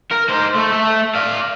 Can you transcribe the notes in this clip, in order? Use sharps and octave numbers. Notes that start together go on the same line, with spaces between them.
A#4
D#4 C5
A3
A3
D5 F5